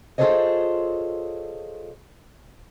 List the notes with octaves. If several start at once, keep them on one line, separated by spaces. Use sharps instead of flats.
F4 G#4 A4 C5 C#5 D#5